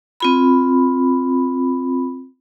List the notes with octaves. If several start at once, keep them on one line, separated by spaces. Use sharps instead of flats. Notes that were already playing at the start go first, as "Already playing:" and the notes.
C4 F4 B5